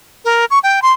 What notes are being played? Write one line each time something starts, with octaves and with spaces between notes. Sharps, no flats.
A#4
C#6
G5
C6